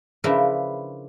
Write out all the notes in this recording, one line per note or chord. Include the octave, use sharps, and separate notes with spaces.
C#3 F3 D4 E4 A#4 B4